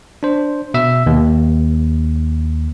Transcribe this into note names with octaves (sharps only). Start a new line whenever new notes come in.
D4 C5
B2 E5 E6
D#2